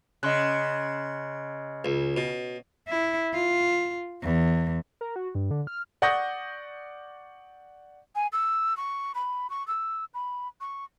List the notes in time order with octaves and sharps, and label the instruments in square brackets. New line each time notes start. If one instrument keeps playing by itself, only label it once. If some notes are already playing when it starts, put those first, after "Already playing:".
[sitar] C#3 [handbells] D#5 C6 F#6
[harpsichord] C#2
B2
[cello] E4
F4
E2
[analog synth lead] A#4
F#4
G2
D3
F6
[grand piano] D5 F#5 C#6 D#6 G6 A#6
[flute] G#5
E6
C#6
B5
C#6
E6
B5
C#6